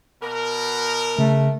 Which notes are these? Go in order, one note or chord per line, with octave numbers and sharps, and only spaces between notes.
B2 A#4
C#3 A3